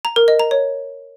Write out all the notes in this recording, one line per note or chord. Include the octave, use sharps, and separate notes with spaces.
A#5
A#4
D#5
A#5
C#5